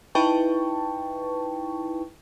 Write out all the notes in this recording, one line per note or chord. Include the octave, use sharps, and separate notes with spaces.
D#4 E4 B4 G5 A5 C#6